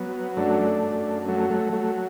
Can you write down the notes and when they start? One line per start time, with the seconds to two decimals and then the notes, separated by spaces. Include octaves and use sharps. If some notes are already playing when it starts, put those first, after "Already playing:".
Already playing: F#3 B3
0.36 F#2 A3 D4
0.83 F#2
1.28 F#3 A3
1.50 A3
1.72 F#3 A3